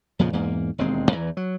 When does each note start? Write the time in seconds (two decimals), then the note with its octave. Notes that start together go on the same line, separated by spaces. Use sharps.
0.19 F2 A#2 C#3 F3
0.33 E2 G#2 A#3
0.78 E1 D#2 G#3 C4
1.12 E2 E3
1.37 F#3